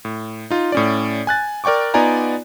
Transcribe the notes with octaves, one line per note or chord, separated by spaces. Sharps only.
A2
D#4 F4
A2 C#4 D5
G#5 F#6 A6
A#4 D5 G5 C#6 D6
B3 D#4 F4 D5 G#5 A#5